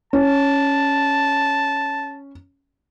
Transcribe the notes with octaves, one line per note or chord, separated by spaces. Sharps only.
C#4 A5